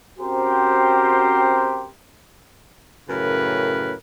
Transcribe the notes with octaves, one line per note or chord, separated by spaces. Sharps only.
C4 C#4 F#4 G4 A#4 C5
F#2 A2 C#3 A#4 B4